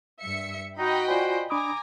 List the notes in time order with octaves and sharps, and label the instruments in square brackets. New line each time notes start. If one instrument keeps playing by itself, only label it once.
[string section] G2 E5 C#7
[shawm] D#4 [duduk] F#4 [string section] D#5 G5 B5
[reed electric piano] F4 D5 G#5 [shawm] C5
[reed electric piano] D4 B5 D#6 [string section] G#5 A#5 [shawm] D6